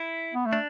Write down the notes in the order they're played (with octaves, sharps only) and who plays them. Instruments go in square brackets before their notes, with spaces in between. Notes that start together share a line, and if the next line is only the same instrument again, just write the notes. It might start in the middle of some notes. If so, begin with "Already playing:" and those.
Already playing: [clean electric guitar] E4
[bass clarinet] B3
A3
[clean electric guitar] D4